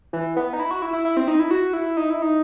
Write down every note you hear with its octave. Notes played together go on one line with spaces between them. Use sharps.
E3
B3
D#4
E4
F#4
E4
E4
E4
C4
D#4
E4
F#4
E4
D#4
E4
D#4